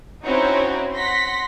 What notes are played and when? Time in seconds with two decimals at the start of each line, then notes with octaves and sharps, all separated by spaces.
0.24 C4 C#4 D#4 E4 F#4 C#5
0.95 F#5 C6 A#6 B6